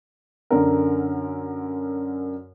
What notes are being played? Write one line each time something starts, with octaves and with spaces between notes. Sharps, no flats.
F#2 D3 A#4